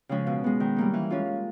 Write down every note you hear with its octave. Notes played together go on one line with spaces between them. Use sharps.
C#3 F3 G#3 C#4
B2
G#3 B3
D#3
G3 A#3 D#4
E3
G#3 C#4 F4